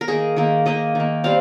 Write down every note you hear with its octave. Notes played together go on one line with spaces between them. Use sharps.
A#4
D#3 A#3 G#4
D#3 A#3
D#3 A#3 D#5
D#3 A#3
G3 C4 F5